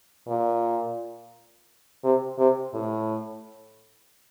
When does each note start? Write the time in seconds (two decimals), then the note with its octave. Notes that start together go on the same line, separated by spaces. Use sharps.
0.27 A#2
2.04 C3
2.38 C3
2.73 A2